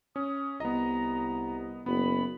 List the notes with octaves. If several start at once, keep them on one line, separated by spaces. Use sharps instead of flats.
C#4 D#6
C2 B3 D#5 A#5
F#1 B3 B5